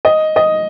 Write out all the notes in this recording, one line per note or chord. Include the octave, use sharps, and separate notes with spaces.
D#5
D#5